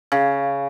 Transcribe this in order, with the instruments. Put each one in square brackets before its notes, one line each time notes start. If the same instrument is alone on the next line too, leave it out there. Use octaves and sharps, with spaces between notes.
[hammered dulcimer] C#3